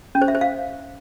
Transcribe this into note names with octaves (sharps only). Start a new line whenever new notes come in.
C#4
C5
E5
C5
F5